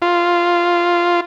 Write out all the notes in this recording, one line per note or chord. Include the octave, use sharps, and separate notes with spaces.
F4